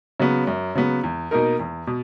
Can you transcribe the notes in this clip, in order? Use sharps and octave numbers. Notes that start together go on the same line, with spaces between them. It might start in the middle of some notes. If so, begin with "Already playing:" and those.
C#3 F#3 B3
F#2
C#3 F#3 B3
E2
B2 A#3 D#4 A#4
E2
B2